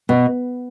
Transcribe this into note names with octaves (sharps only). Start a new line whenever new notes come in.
B2